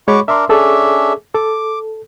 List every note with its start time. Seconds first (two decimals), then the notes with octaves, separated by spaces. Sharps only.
0.08 G#3 F#4 C#5 B5 C#6 D6
0.28 D4 A#4 E5 C6
0.49 C#4 D4 G#4 A4 E5
1.34 A4 D6